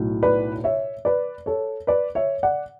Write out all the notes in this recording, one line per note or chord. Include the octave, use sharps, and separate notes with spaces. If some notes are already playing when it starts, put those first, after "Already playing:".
Already playing: B1 A2 F#3
B4 D5
C#5 E5
B4 D5
A4 C#5
B4 D5
C#5 E5
D5 F#5